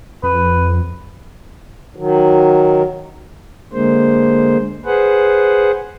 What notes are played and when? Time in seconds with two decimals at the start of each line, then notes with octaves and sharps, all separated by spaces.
0.24 F2 B4
1.96 D#3 F#3
3.73 D3 G#3 A#3 C5
4.85 G#4 B4 C5 F#5